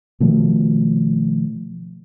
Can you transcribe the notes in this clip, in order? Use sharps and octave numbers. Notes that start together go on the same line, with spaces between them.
B2 D#3 F3 A3